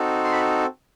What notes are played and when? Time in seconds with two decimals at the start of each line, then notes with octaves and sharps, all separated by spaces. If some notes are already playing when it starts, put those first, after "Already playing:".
Already playing: C4 D#4 F#4 A4
0.24 C6
0.32 B5